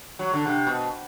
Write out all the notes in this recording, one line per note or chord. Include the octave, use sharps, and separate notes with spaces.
F#3
D3
C3
B2